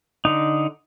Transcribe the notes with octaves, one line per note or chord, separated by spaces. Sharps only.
D3 D#4